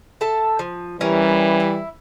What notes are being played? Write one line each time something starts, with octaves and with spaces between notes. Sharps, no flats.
A4 E5 A5
F3
E3 G3 C#4 A#4
E4